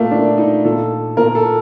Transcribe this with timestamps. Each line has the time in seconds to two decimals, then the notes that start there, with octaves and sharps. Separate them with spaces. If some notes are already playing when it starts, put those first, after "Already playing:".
Already playing: A#2 A3 A#3
0.11 A#2 D4
0.38 D#4
0.64 A#2 A4
1.17 A#2 A#4
1.35 A4